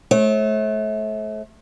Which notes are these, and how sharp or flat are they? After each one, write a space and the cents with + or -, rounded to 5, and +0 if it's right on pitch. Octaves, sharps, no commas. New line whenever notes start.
A3 -30 C#5 -45